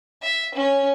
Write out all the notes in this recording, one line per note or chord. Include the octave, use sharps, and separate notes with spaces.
E5
C#4